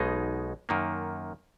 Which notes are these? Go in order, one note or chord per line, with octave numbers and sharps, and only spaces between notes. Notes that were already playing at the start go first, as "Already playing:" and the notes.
Already playing: B1 B2 G#3 D#4
F#2 D#3 A#3